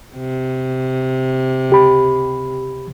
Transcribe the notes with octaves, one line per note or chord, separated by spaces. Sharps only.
C3
C#2 G4 B5